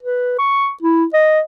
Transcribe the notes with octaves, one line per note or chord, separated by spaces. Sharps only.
B4
C#6
E4
D#5